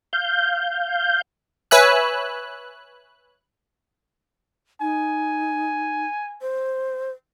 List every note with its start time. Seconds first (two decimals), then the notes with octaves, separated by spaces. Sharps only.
0.13 F5 G6
1.71 B4 C#5 E5 G#5 E6 F#6
4.81 D#4 G#5
6.41 C5